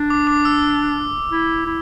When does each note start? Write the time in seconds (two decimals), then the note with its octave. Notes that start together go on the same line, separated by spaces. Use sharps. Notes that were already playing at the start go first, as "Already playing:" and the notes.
Already playing: D4
0.10 D6
0.27 D6
0.45 E6
1.31 E4
1.65 E4